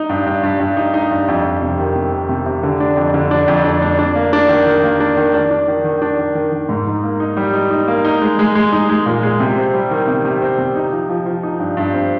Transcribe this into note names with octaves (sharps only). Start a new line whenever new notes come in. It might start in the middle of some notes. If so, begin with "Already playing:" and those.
Already playing: D#4
G2
G2
G2
G2
D#4
D#4
G2
F2
F2
C3
D#3
C3
D#3
C3
C3
D3
D4
F2
D3
D4
F2
D4
D4
D4
A#3
D4
D#3
D#3
A#3
D4
D#3
D4
D4
D#3
D#3
D4
D#3
D#3
D#3
G#2
D#4
A#3
D#4
G3
D#4
D#4
A#3
D#4
G#3
G#3
G#3
D#4
G#3
A#2
G#3
C3
C4
G3
D#3
C3
C3
C4
C3
D#4
F3
F3
F3
D#4
G2
G2
C4